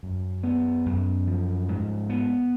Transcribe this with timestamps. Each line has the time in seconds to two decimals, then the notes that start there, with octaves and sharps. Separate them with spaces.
0.03 F#2
0.43 B3
0.86 F#2
1.27 F3
1.69 G#2
2.10 B3